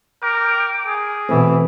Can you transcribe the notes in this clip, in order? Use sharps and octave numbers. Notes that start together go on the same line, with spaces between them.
A#4 G5 D6
G#4
B2 E3 A3 C4